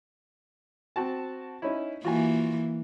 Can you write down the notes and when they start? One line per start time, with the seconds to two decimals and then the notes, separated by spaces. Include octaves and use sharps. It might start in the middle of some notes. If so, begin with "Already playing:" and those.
0.96 C4 F#4 A5
1.62 C#4 D#4 E4
2.05 E3 A#3 F4 F#4 G#5